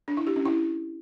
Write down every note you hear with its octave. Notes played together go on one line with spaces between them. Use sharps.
D4
E4
G4
C#4
E4